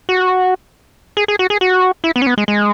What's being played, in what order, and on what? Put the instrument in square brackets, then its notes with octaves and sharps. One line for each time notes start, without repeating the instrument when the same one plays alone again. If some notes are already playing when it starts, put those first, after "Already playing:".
[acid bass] F#4
G#4
G#4
F#4
G#4
F#4
E4
B3
C#4
B3
G#3
G#3